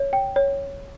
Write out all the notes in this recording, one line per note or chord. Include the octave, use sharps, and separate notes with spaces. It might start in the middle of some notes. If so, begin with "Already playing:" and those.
Already playing: C#5
G5
C#5